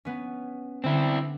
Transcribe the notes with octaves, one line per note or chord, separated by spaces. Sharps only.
B3 C#4
D3 C4 E4